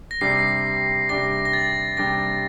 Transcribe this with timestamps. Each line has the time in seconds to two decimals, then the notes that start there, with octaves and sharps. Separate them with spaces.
0.11 A#6
0.21 C3 G3 D4 G4 D5 C7
1.09 C3 G3 D4 G4 D5 A#6
1.45 A#6
1.53 A6
1.97 C3 G3 D4 G4 D5 A#6